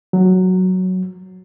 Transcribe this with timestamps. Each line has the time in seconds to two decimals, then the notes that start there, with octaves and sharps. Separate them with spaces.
0.13 F#3